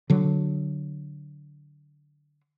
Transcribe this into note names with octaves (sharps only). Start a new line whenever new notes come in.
D3 F#3